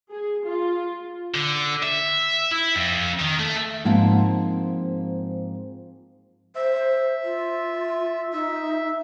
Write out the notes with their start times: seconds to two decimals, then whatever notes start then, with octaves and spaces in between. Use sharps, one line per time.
0.11 G#4
0.46 F4
1.35 D3
1.83 E5
2.52 E4
2.76 F2
3.19 D#3
3.39 A3
3.84 G#2 F3 A#3 C4 F#5 A5
6.56 C5 E5
7.24 F4
8.33 D#4 E5